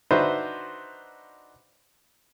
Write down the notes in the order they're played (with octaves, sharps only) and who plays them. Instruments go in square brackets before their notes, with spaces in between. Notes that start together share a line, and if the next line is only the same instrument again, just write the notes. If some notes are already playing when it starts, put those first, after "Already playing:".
[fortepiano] D4 D#4 F#4 B4 C5 E5